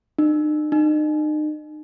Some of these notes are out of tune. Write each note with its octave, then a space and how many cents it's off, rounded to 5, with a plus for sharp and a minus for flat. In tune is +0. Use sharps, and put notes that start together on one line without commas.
D#4 -45
D#4 -35